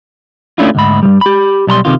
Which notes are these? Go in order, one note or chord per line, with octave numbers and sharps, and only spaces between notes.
A3 C#4 D4 E4 F4
D2 G#2 B5
G2 C3 G3
G4 B5
B1 G3 A#5 C6
C3 D#3 F4